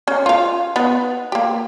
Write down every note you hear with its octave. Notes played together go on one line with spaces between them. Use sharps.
C#4
F4 F5
B3 D#4 B4
A#3 G4